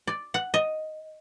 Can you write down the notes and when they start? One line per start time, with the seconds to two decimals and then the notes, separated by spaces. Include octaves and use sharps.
0.07 D5
0.34 F#5
0.54 D#5